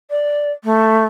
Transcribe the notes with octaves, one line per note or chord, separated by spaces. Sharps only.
D5
A3